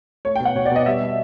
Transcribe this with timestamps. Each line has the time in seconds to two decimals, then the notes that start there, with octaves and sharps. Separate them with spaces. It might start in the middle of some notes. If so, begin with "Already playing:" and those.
0.25 A3 C#5
0.36 G5
0.40 B2
0.45 F#5
0.55 B2 C#5
0.65 D5
0.71 B2 D#5
0.86 G3 E5
1.01 G3